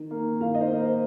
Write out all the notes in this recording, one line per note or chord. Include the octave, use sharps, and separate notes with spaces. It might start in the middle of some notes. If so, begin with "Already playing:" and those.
Already playing: D#3
A#3
D#3 F5
D#5
C5
A#3
C5